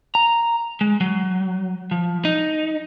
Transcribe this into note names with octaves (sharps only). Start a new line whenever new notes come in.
A#5
G#3
F#3
F3
D#4